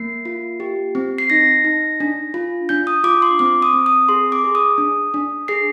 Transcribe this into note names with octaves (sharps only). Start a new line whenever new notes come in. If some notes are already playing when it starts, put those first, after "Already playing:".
Already playing: A#3 C7
F4
G4
C4
C7
D#4 A#6
D#4
D4
F4
D4 G6
D#6
F4 D6
C6
C4 D6
D#6
C4
D#6
G#4 C6
D6
G#4
D#6
D4
D4
G#4 C7